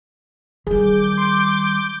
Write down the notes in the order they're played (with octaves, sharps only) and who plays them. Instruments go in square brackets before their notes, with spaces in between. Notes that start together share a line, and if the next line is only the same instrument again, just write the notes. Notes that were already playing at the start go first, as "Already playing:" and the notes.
[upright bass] D#3 G3 [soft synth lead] G#4 [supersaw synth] D6 G6
[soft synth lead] C6